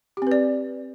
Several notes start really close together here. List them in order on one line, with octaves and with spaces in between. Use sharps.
G4 C4 B4 D5